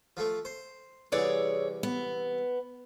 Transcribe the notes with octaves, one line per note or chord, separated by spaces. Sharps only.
F3 A3
C5
C2 E3 G#4 C#5 D5
B3